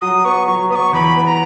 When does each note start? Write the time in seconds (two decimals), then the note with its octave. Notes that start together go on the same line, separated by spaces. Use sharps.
0.01 F#3 D#6
0.25 B3 C#6
0.47 F#3 C#6
0.70 B3 D#6
0.76 C#6
0.93 E2 B5
1.16 B3
1.23 B5
1.27 A#5